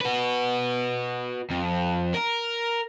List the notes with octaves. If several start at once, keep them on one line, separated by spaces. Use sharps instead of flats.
F#4 B4
F2
A#4